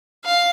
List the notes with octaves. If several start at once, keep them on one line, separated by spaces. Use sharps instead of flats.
F5